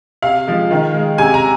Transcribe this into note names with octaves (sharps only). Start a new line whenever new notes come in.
C3 F5
F3 G#3
D#3
G#3
C3 G#5
A#5